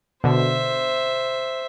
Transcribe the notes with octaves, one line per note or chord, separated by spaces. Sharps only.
B2 D3 C5 E5